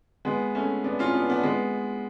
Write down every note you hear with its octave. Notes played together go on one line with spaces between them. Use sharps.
G#3 B3
A3 C#4
B3 D4
C#4 F4
B3 D4
B3 D4
G#3 B3